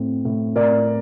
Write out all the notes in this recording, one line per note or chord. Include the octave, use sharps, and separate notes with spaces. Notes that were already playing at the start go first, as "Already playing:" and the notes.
Already playing: A2 C4
A2
A2 A#4 D5